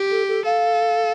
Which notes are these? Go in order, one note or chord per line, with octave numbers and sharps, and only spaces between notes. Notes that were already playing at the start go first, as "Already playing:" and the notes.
Already playing: G4
A4
A4
A4 F5